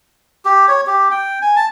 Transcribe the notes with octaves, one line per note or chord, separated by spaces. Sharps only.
G4
C#5
G4
G5
G#5
A5